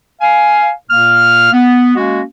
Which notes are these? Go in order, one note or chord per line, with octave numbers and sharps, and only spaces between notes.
F5 G#5
A#2 A#3 F6
B3
G#3 A#3 C#4 F#4